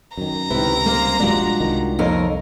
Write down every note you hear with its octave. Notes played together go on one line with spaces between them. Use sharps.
F#2 D#3 A#5
C#2 C3 D#3 E4 B4
G3 A#3 C5 F5
D#1 A#1 G2 G#3 D4 F4 F#4
C2 D#3
F2 A#3 D#4 A#4 C#5 A#5